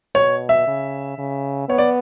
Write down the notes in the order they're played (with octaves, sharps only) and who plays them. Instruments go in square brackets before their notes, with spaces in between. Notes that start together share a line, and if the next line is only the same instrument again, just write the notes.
[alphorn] B2 [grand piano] C#5
[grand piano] E5
[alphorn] C#3
C#3
[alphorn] B3 [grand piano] C#5
[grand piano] D5